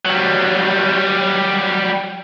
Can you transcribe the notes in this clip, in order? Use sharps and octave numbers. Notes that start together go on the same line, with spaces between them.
F#3 G3